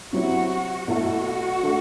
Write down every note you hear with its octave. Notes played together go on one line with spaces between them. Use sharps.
C3 F#3 C4 E4 F#4
B2 A3 E4 F#4 A4
D3 A3